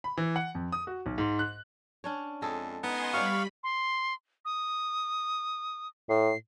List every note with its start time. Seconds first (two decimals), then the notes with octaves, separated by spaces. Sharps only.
0.04 B5
0.17 E3
0.36 F#5
0.55 F2
0.72 D#6
0.87 F#4
1.06 B1
1.18 G#2
1.39 F#6
2.04 C#4 D4 C#5
2.42 F2 G#3 G#4 A4
2.83 B3 D#4 D#5 G#5 C6
3.13 G3 G4 C#5 D5 F5 B5 C#6
3.63 C6
4.45 D#6
6.09 A2 C7